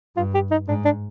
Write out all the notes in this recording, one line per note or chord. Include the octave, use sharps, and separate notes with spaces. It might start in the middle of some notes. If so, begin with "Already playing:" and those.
G2 F4
G4
D#4
G#2 D4
D4